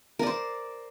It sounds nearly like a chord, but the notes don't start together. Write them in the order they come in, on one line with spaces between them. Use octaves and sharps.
A#4 D5 C5